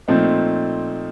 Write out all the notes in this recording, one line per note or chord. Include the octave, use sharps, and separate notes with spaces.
A#2 F3 A3 C4 D#4